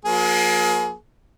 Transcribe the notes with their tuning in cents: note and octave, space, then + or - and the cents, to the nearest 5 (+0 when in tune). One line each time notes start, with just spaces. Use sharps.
F#3 -40 A#3 +25 G#4 +30